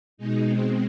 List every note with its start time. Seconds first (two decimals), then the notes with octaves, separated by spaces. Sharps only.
0.17 B2 G#3 D#4
0.47 C4